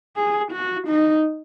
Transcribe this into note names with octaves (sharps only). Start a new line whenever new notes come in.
G#4
F#4
D#4